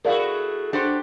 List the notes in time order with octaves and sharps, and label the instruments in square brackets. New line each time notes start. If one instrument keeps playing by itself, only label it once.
[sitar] A3 E4 F#4 [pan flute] G#4 [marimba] A#4 D5 F5
[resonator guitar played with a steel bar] D4 F#4 C5 [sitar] G4